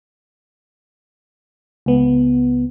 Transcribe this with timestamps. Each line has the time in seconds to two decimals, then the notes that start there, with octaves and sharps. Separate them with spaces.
1.86 C#2 B3